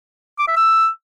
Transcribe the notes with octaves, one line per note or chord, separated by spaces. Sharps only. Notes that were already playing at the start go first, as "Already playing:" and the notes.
D6
E5
E6